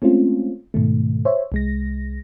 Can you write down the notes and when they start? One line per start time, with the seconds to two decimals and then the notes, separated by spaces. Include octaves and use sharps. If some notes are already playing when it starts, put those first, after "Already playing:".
0.02 G#3 A3 C4 C#4 F4
0.74 G#2 B2 D#3 A3
1.25 C5 C#5 E5
1.52 C2 G#3 A#6